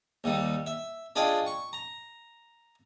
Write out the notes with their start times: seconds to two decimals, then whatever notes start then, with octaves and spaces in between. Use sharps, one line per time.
0.24 D#2 D#3 G3
0.66 E5
1.16 D4 F4 G#4 D#5 G5
1.46 C#6
1.73 A#5